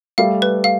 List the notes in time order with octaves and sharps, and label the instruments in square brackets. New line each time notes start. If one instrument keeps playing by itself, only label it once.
[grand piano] G3 A3 [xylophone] F5
[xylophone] B4
F5